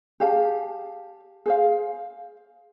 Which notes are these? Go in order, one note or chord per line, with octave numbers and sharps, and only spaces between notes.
G4 G#4 F5 A5
G#4 C5 F5